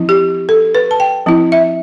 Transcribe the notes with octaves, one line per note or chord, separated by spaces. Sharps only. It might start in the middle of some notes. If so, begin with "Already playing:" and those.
Already playing: F3 C4 E4
G4
A4
B4
A5
G5
F3 C4 E4
E5